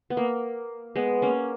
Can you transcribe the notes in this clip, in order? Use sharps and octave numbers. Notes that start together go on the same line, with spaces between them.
B3
A#3
G#3 B3
A#3 C#4